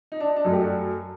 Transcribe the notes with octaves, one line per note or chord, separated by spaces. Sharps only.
D#4
D4
D#4
D4
F#2 F#3 A3 D#4
G4
D4 F#4